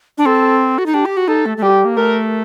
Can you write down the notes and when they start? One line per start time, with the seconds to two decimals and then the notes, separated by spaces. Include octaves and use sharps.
0.18 D4
0.26 C4 A4
0.78 F#4
0.86 D#4
0.94 D4 G4
1.05 G4
1.17 F#4
1.28 D#4 A4
1.46 A3
1.57 A3
1.62 G3 G4
1.85 A#3
1.97 A3 A#4